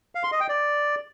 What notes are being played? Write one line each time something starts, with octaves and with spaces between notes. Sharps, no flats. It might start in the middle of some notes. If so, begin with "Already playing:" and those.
F5
C6
D#5
G5
D5